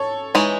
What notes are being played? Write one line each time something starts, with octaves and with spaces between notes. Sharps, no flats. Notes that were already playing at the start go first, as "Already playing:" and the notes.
Already playing: A4 C#5
E3 G#3 D#4 C#5